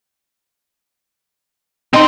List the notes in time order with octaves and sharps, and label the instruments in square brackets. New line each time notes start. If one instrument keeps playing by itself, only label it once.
[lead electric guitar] C4 C6 [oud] D#4